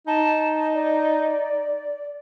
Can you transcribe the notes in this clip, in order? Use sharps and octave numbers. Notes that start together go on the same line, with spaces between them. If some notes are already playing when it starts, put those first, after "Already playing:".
D#4 A5
D5